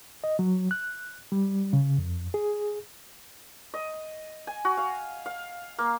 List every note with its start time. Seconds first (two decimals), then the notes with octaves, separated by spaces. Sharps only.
0.24 D#5
0.39 F#3
0.71 F#6
1.32 G3
1.73 C#3
1.98 F2
2.34 G#4
3.74 D#5
4.47 G#5
4.65 F#4
4.77 F5
5.26 F5
5.78 A#3